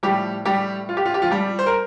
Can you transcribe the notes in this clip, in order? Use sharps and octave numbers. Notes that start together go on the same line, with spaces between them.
A2 F3 G3 G4
G3 G4
F4
G4
F4
G4
F3 F4
G3 G4
C5
A#4